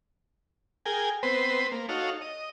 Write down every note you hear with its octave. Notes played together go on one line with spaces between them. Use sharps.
G#4 A#4 G5 G#5
B3 C4 B4 C5
A#3
D#4 F#4 A4 C#5 F5
D#5